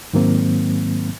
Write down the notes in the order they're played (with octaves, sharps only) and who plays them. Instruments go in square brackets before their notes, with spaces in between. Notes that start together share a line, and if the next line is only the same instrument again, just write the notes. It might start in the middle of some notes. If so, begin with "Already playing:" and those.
[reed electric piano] G#2 D#3 F#3 A#3 C4